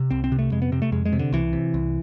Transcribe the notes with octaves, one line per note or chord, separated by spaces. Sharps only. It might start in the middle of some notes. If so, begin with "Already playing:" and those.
Already playing: C3
C2 C4
C4
C3
A3
F2 G#3
B3
C3 C4
A3
F2 G#3
G#3
C3
D3
C2 E3
C3
C2